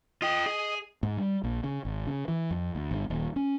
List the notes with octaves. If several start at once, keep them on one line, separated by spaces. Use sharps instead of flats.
F4 D#5 G5
G#4 D#5
G#2
G3
A#1
C#3
G#1
C#3
E3
F2
D2
G1
D#1
C#4